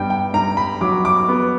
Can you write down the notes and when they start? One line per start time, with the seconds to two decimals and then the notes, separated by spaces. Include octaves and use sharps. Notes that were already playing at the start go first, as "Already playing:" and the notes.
Already playing: G2 B3 G5
0.10 G5
0.33 G2 A#5
0.57 B5
0.81 F#3 D6
1.05 D6
1.28 B3